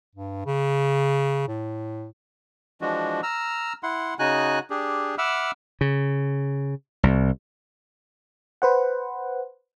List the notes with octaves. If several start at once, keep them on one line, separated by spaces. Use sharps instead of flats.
G2
C#3
A2
E3 F3 G#3 D4 F#4
A#5 E6 F6
E4 F#5 C6
C#3 D#4 F#4 G#5 F#6
D4 G4 G#4
E5 F#5 B5 D6 E6 F6
C#3
C2
B4 C5 F#5